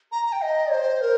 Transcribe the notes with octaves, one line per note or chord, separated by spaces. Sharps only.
A#5
A#5
G5
D#5
C5
A#4